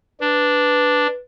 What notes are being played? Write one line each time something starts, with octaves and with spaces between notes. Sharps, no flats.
D4 B4